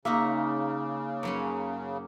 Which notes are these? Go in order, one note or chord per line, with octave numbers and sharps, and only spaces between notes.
C#3 A#3 D#4 F#4 E5
F#2 F#3 C#4